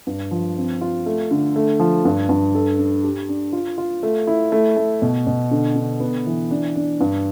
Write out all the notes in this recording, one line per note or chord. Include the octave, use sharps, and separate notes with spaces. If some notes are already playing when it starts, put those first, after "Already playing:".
G2
F3
C4
F4
A3
D3
A3
F3
G2
G2
A4
D4
G4
D4
F4
F4
A3
E4
A3
A3
B2
B2
D3
D3
B3
E3
D4
D4
G2